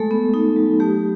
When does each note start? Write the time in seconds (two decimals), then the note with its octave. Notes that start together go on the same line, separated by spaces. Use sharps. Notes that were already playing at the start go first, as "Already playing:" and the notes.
Already playing: G#3 A3 A4
0.11 B3
0.34 D#4
0.56 F#3
0.80 A3 G4